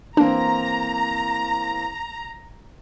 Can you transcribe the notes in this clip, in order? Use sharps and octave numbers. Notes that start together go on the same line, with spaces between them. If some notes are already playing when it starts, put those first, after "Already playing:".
E3 A#3 C4 D4 A#5